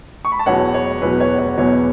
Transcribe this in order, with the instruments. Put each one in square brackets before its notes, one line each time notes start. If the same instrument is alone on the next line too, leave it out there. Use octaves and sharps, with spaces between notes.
[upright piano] C#6
B5
A5
E2 B2 F#3 C#5 F#5
C#5
E2 B2 F#3 B4
C#5
C#5
E2 B2 F#3 C#5